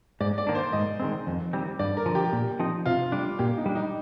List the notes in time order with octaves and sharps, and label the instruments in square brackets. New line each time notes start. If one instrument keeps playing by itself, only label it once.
[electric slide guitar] G#2 [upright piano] D5
[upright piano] D5
[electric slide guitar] D#3 A#3 D4
[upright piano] C5
[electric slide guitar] G#2 [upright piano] D#5
[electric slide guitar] D#3 G#3 C4
F2
D#3 G3 C4
[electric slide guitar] G2 [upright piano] D5
[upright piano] A#4
[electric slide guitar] D3 F3
[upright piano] G4
[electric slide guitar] A#2
F3 C4 D#4
[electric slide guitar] C3 [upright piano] F4
[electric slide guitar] G3 D4
[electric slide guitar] A#2 [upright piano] G4
[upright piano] D#4
[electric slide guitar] G3 D4
[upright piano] D#4